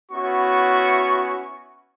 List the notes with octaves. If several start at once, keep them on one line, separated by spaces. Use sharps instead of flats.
B3 C#4 E4 F#4 C#6